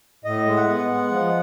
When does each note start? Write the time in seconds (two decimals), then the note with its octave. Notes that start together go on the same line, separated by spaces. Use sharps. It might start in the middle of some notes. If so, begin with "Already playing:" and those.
0.24 A2 D#5
0.46 G#3
0.56 F#5
0.68 B3
0.89 G#3
1.11 F3